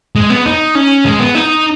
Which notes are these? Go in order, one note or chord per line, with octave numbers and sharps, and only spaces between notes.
G#3
B3
D#4
C#4
G#3
B3
D#4